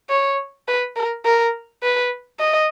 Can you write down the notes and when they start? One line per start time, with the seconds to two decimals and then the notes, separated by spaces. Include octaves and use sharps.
0.10 C#5
0.68 B4
0.96 A#4
1.25 A#4
1.83 B4
2.40 D#5